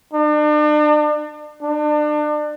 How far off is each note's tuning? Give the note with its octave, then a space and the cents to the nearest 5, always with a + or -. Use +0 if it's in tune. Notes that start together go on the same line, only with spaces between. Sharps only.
D4 +40
D4 +35